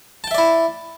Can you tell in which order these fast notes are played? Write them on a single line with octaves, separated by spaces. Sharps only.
A5 G5 E5 D5 E4